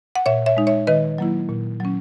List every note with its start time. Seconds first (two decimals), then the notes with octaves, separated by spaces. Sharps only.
0.16 F#5
0.26 A#2 C#5 E5
0.46 C#5 E5
0.57 G#3 D#4
0.67 C#5 E5
0.87 D#3 B4 D#5
1.18 F#3 A#3 E4
1.49 A#2
1.80 F#3 C#4